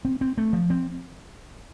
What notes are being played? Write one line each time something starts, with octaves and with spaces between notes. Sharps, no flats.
C4
C4
A3
F3
C4